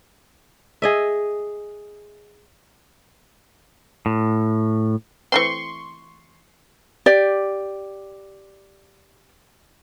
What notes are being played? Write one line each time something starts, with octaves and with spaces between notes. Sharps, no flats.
G#4 D#5 E5
A2
E3 A3 C4 C6 C#6
G4 D5